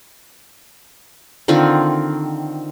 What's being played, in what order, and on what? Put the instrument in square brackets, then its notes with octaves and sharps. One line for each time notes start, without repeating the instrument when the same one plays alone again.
[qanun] D3 D#3 C4 F4